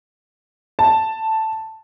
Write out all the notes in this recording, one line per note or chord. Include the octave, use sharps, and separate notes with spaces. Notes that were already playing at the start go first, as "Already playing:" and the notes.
A5